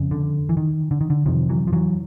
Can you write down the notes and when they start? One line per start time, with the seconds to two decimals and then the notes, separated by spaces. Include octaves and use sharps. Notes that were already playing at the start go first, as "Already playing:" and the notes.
Already playing: F2 C#3
0.11 D3
0.49 E3
0.57 D#3
0.91 D3
1.01 D#3
1.10 D3
1.26 F2 C3 D#3 F3
1.49 E3 F#3
1.67 F3
1.73 E3 F#3